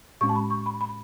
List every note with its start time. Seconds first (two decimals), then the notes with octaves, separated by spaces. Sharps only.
0.21 A2 G#3 C#4 C#6
0.29 A5
0.36 B5
0.50 C#6
0.66 B5
0.81 B5